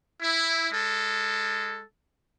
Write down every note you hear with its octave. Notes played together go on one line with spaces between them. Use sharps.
E4
G#3 A4